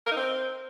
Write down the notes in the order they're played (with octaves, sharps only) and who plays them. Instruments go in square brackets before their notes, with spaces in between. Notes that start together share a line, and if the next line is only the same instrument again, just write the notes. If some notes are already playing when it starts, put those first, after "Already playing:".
[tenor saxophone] A#4
D#4
C4